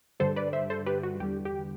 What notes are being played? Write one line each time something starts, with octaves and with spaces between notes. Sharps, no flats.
G2 D3 G3 A4 C5
B4 D5
C5 E5
A4 C5
G4 B4
F#4
E2 D3 G3 G4
G4